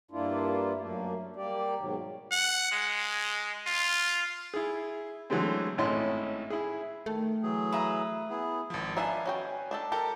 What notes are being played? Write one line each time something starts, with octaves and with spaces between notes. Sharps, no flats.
G2 A#3 D4 E4 F4
F#2 A3 A#3
G3 A#3 G4 D5
G#2 B2 D#3 F#3
F#5
G#3
F4
E4 G#4
D3 E3 F#3 G#3 A3 C4
G#1 A2 C#4 E4 D#5 C6
E4 G#4
D#3 A3
E3 F#3 G#4
B4 E5 A#5
B3 E4 G#4
G#1 F3
D#3 D4 B4 E5 F5 G#5
C#4 F#4 G5
D4 G4 A4
G4 A4 A#4 A5